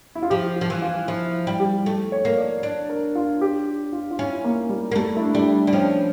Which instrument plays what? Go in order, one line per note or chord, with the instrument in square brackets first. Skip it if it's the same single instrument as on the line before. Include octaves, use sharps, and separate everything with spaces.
[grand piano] E4
F4
[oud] F3 [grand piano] G4
[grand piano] F4
[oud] F3
E3
[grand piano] F4
[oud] F3 [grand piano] E4
[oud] G3
[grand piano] G4
[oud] A3
[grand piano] C#5
[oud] A#3
[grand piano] D5
[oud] D4
[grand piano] A#4
F4
G4
F4
F4
[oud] C#4 [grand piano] E4
[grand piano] A#3
G3
[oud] A#3
[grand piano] G3 [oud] A3
[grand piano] E4
D4
[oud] G3 [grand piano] D4
[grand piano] E4
[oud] G3
[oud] F3 [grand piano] C#4